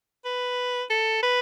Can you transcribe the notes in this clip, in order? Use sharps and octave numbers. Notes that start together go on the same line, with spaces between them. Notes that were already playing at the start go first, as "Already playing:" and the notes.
B4
A4
B4